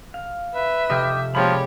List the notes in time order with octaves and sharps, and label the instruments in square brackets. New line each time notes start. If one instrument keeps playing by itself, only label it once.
[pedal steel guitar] F5
[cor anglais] B4 [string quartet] E5
[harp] F1 C3 F6 [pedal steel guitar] D#5 G5 D6
[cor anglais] F3 [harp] G#3 A#3 C#4 [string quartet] G4 C#5 [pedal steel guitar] D5 B5